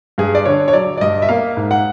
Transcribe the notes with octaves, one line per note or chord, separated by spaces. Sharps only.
G2 G#4
D5
D3 C#5
C#5
F#3 D5
D5
G2 D#5
E5
A#3 F5
G#2
F#5